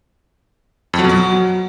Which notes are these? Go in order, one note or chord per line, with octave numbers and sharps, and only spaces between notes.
F2
F#3
B2
F#3